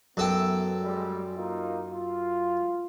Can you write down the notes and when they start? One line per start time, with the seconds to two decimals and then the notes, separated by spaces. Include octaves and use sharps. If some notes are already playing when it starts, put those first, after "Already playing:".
0.17 F#2 E3 F#3 B3 A4 G5
0.82 G3 G#3
1.36 A#3 D#4 F4
1.90 F4